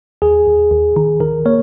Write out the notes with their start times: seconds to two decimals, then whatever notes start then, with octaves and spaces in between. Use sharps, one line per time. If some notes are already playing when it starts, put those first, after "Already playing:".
0.22 D#2 G#4
0.47 D#2
0.71 D#2
0.96 D#3
1.20 D#3 A#4
1.46 A#3 C#5